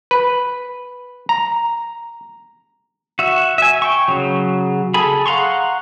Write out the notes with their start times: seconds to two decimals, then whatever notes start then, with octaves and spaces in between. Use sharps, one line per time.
0.11 B4
1.29 A#5
3.19 F#4 E5
3.58 E5 G#5
3.82 G5 C#6
4.08 C#3 F#3
4.94 G#4 A4 G#5 B5
5.26 F5 F#5 A#5 C6 C#6